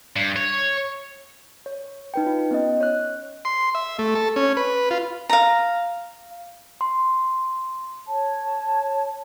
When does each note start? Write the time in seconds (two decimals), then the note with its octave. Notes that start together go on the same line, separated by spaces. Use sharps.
0.16 G2
0.36 C#5
1.66 C#5
2.14 D#4 B4 G5
2.26 F4
2.51 B3 C#4 D#5
2.80 C#5 F#6
3.45 C6
3.75 E5
3.99 A3
4.15 A4
4.36 C#4
4.57 B4
4.91 F4
5.30 F5 A#5
6.81 C6
8.08 C#5 A5